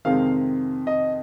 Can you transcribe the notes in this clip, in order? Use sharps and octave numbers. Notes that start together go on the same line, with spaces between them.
F2 C3 D#3 G#3 C4 F5
D#5